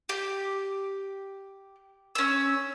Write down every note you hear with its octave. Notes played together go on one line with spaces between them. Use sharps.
G4
C#4 E6